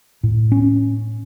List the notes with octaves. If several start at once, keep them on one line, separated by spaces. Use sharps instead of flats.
A2
C#4